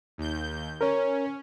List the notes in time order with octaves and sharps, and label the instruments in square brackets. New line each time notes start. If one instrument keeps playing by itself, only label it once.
[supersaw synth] D#2 G6
[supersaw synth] C#4 [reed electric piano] A#4 C#5